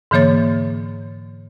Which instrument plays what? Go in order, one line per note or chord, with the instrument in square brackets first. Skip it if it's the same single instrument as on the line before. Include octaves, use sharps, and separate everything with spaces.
[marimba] G#2 D3 E3 A#3 C#5 A6